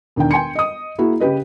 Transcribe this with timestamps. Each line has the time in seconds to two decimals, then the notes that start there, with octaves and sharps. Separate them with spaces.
0.16 E1 D#3 D4 G5
0.31 G5 G#5 C6 C#7
0.55 D#5 D#6
0.98 A#3 E4 F#4 G#4
1.20 C#3 G4 B4 D#5